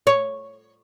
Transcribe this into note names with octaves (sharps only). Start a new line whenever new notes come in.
C#5